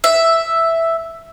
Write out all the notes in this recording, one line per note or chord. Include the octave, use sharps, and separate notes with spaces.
E5